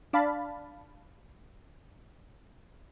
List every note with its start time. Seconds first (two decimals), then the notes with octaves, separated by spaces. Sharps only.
0.13 D4 D5 F5 A5 B5